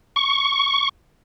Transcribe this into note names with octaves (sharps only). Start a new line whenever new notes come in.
C#6